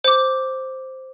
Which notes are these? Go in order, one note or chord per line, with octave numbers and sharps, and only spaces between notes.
C5 D6